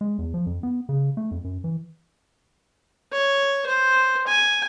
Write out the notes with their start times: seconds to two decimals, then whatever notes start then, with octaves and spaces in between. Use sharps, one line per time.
0.01 G#3
0.18 E2
0.34 F3
0.46 F2
0.63 B3
0.89 C#3
1.17 A3
1.31 F2
1.44 F#2
1.64 E3
3.13 C#5
3.66 C5
4.27 G#5